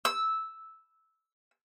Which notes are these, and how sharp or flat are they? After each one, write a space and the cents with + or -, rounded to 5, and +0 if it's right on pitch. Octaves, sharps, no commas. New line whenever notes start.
E6 -10